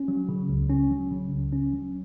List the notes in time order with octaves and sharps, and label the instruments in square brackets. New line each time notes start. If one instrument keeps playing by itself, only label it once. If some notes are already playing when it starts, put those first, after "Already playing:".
Already playing: [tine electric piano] C#4
F#3
C#3
C#2
C#4
F#3
C#3
C#2
C#4
F#3